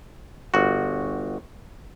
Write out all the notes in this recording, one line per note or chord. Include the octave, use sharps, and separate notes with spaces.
G1 F#4